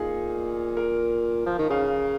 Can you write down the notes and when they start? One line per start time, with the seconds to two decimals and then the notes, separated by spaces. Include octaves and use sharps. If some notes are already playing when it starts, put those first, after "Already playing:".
Already playing: A#2 D#4 F4 G#4
0.77 A#4
1.46 F3
1.59 D#3
1.70 C#3 F5